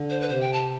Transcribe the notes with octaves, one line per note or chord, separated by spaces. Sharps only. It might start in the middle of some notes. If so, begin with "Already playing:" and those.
Already playing: D3
C5
B4
C3 C5
G5
A5